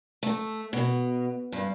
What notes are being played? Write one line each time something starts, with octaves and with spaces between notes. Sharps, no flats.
A3
B2
G2